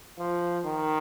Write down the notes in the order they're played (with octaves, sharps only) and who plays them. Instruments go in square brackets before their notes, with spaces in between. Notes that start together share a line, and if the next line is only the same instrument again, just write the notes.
[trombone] F3
D#3